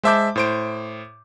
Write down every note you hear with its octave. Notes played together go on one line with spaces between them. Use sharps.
G#3 C5 E5 A5 D6 G6
A2 C5 D7